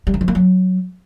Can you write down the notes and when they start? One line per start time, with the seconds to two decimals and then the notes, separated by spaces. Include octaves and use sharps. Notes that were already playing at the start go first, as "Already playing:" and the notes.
0.07 G3
0.14 E3
0.21 F3
0.28 A#3
0.35 F#3